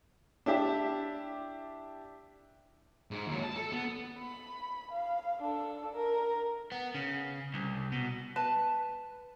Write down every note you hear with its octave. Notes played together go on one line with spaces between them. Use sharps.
D4 E4 G4 D5 E5
G#2
D#2 F#3
A5
A4
B3
B5
F5
D4 A4
A#4
B3
C#3
C2
B2
B4 A5